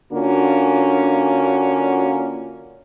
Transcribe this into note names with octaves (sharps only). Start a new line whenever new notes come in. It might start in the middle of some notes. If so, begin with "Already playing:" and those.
D3 A#3 C#4 D4 F4 F#4